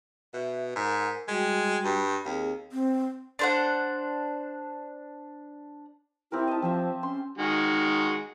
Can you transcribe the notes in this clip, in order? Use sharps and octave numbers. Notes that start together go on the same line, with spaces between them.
B2 E5
G#2 A#4 F#5
G3 G#3 F#4 G5
G2
D#2 C4 G#4
C4
D4 C5 F#5
C4 E4 G4 A#4
D#5 A5
F3 C4 C5 E5
C#4 C6
D#3 G#3 F#4